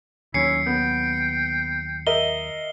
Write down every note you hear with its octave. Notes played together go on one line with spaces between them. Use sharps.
D#2 F#3 C#4 E4 C7 C#7
B3 G5
A#4 D#5 E5 G7